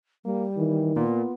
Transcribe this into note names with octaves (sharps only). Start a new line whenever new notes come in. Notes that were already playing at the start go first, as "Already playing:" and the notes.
G3 A#3
D#3 E3
A#2 B3 F4